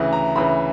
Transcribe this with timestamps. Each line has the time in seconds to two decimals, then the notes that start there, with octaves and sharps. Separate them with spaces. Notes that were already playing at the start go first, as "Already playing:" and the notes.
Already playing: D2 C#3 E3
0.13 A#5
0.36 D2 C#3 E3 B5